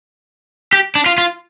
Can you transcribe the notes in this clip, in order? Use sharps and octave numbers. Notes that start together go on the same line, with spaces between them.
G4
D4
F4
F4